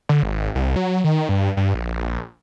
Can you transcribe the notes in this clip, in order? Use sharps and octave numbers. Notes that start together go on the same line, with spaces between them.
D3
G#1
C2
F#3
D#3
G2
G2
A#1